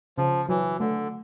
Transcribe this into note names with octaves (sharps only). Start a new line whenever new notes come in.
C#3 F3
E3 F#3
D3 A3